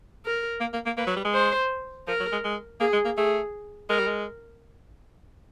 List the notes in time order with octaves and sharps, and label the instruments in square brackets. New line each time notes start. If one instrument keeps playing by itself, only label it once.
[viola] A#4
[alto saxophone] A#3
A#3
A#3
[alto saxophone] A#3 [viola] B4
[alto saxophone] F#3
G3
G#3
[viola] C5
[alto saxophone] F3 [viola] A#4
[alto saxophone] F#3
G#3
G#3
[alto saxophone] A#3 [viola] G#4
[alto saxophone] G#3
A#3
[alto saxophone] A3 [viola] G#4
[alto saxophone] G#3 [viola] A#4
[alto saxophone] G3
G#3